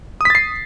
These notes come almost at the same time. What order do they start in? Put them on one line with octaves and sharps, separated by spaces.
D#6 B6 A6 C7